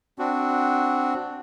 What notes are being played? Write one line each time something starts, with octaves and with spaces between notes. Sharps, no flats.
C4 D4 F#4